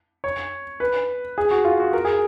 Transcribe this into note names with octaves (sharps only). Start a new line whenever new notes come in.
C#5
B4
G#4
F#4
F4
F#4
A#4
G#4